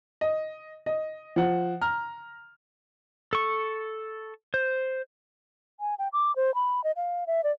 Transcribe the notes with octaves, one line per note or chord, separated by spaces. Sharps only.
D#5
D#5
F3 F#5
A#5 F6
A4 C#6
C5
G#5
G5
D6
C5
B5
D#5
F5
E5
D5